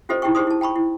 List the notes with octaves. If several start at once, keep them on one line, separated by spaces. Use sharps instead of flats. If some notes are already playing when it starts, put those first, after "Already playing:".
C#4 F4 G4 A4 C5 D#5
D#4 E4 G4 G#4 G5 C#6
D#4 G4 G#4 C5 C6 D#6
E4 A5
G5 A5 B5 C#6
E4